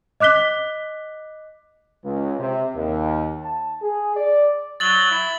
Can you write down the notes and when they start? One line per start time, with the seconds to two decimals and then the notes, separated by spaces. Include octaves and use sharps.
0.20 D#5 D6 F#6 B6 G7
2.04 C#2
2.40 C3
2.76 D#2
3.43 A5
3.82 G#4
4.17 D5
4.80 F#3 A6 F#7 G7
5.11 E4